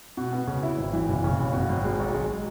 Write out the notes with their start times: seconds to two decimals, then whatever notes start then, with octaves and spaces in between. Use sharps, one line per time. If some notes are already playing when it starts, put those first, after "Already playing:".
0.17 B2
0.33 B3
0.47 C#3
0.63 E4
0.78 G#1
0.93 E3
1.08 F#1
1.24 C#3
1.39 F#1
1.54 B2
1.69 G#1
1.84 G#3
2.00 B1
2.14 G#3